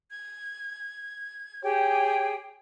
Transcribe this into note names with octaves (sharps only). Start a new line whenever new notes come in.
G#6
G4 G#4 C#5 G5